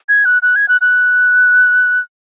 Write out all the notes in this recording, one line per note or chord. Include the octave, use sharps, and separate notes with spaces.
G#6
F#6
F#6
G#6
F#6
F#6